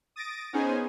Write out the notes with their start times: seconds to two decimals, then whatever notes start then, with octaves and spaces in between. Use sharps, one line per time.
0.16 D#6 A6 A#6 D7
0.53 B3 C#4 D#4 G#4 C5 G#5